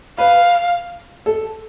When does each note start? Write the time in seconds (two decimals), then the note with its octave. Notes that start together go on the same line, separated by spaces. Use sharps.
0.18 B4 F5
1.26 A4